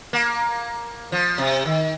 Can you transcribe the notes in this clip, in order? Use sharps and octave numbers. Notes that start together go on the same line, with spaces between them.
A#3
F3
C3
D#3